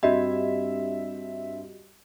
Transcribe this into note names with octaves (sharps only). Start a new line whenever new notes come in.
G2 C4 F#4 G4 D#5 E5